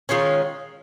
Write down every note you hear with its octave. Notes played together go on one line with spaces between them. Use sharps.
D#3 G#3 C#4 F4